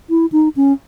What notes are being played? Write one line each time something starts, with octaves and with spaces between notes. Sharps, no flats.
E4
D#4
C#4